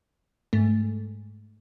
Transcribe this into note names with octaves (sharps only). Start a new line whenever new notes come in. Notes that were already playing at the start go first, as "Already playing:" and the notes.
G#2 A3